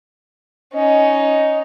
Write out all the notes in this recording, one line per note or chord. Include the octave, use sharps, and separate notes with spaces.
C#4 D#4 D#5